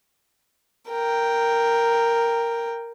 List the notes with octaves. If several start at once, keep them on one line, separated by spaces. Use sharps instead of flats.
A#4 G5